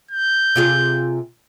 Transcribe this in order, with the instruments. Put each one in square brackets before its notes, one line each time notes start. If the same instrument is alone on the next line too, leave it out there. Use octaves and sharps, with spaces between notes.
[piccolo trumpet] G6
[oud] C3 F4 G#4